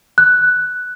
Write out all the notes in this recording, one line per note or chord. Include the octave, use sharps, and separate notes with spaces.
F#6